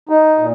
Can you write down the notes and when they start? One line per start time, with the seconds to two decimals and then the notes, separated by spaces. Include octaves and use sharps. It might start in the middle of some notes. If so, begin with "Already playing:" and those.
0.09 D#4
0.38 A#2